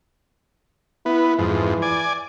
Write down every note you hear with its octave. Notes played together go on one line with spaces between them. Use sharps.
B3 E4
F2 G#2 E3
D5 G#5